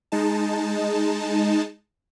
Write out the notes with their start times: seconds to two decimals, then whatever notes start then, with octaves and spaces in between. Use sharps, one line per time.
0.12 G#3 D#4 A5